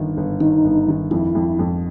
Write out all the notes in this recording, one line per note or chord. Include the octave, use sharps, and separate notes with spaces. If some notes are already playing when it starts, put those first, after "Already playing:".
Already playing: G1 D#3
G1
D#3 D#4
G1
D#3
F2 E4
F2
F2